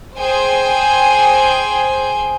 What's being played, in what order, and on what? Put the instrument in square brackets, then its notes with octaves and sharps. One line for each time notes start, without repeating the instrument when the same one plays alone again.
[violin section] G#4 C5 G5 G#5